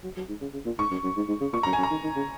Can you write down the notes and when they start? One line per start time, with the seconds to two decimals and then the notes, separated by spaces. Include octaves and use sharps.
0.04 F#3
0.17 F#3
0.28 G#2
0.41 C#3
0.53 C#3
0.66 A#2
0.78 G#2 C#6
0.91 F#2
1.04 F#2
1.16 G#2
1.28 G#2
1.41 C#3
1.53 A#2 C#6
1.63 F#2 A#5
1.73 G#5
1.78 F#2
1.83 A#5
1.91 D#3
2.03 D#3
2.16 C#3